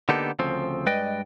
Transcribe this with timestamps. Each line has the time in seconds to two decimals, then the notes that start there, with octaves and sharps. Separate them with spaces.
0.09 D3 A#3 B3 D#4 G4 A4
0.39 D2 C#3 F3 C4
0.86 G2 G#3 B4 D5 D#5 G5